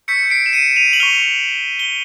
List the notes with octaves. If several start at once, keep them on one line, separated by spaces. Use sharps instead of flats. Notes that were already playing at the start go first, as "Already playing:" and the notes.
C#6 E6 G6 B6 C#7
C7 D7
E7
C#7 D#7
D#7 F7
F#7
C#6 F6 F7 G7
G7